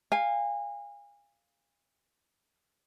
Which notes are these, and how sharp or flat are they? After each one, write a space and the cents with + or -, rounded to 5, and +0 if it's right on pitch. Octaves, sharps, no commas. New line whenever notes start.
F5 +0 G#5 -30